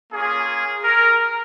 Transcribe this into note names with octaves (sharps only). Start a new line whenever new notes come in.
A#3 C#4 F4 G#4
A#4